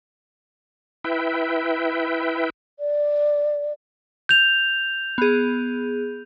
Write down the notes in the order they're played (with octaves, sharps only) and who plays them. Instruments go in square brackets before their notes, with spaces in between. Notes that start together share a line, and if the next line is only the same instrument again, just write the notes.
[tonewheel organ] E4 B4 E5 G5
[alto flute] D5
[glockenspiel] G6 F7
[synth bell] B3 G#4